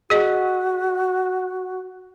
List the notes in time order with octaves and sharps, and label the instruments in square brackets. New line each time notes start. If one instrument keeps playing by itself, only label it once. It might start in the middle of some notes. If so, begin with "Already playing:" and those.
[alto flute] F#4 [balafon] G#4 D#5